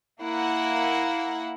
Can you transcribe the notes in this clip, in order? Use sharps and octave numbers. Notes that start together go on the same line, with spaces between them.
A#3 E4 F#5